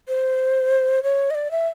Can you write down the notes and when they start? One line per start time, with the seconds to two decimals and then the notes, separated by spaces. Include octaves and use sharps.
0.08 C5
1.03 C#5
1.30 D#5
1.35 D5
1.51 E5